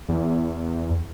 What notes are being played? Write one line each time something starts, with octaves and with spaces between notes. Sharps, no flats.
E2